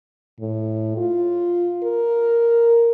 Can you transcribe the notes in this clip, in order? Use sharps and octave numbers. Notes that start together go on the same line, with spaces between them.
A2
F4
A#4